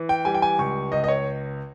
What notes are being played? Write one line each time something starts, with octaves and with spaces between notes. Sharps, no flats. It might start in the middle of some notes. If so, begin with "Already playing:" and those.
Already playing: E3
G5
G3 G#5
G5
G#5
C#2 C#6
C#2 D#5
D#5
C#5